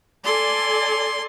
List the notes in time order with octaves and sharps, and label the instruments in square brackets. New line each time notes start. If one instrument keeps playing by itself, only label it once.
[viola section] A4 D5 G#5 [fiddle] C6